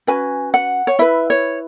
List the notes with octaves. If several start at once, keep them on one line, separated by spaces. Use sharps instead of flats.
C#4 F#4 B4 G#5
F#5
C#5
E4 B4 E5
C#5